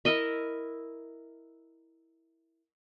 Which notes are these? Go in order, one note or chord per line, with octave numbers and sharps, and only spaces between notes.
E4 A#4 D#5 E5